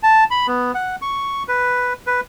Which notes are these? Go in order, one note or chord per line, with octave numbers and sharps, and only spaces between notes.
A5
B5
B3
F#5
C#6
B4
B4